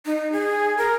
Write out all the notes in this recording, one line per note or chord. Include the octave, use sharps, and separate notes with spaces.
D#4
G#4
A#4